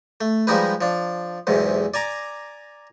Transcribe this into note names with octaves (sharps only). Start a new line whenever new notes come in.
A3
F3 G3 G#3 D#4 G4 B4
F3 D4
B1 E2 G#2 C3
D5 G#5 A#5 D6